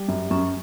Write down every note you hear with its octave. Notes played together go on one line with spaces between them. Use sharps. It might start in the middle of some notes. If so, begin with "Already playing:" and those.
Already playing: G3
F#2
F#2 C#4